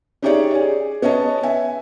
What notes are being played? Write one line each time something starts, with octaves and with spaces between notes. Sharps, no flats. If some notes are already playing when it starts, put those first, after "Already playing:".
C#4 D#4 G4 G#4 C#5 D5
G#4
B3 C#4 C#5 D#5 A5
E5 G#5